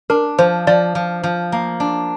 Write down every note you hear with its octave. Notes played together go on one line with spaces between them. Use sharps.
D4 A#4
F3 C5
F3 D5
F3
F3
A#3
D4